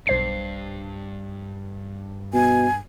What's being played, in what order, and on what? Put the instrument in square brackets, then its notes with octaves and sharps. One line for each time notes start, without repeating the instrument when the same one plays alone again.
[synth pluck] B1 C5 C7 [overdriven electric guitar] G2
[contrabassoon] B2 [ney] G#5